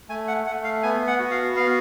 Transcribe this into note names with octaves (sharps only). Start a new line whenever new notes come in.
A3 G#5
F#5
A3 F#5
F5
B3 G#5
F#5
F#4
F5
B3 F5